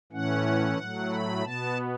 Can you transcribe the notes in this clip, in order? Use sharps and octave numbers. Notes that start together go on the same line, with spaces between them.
A2 E3 A3 C#4 F#5
A2 F#3 A3
B5
B2 B3 A5